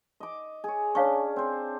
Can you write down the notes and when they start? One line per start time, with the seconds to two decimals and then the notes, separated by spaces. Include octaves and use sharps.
0.20 D#5 D6
0.64 G#4 C#5
0.95 C#4 D4 C#5 F5 C#6
1.36 C4 C5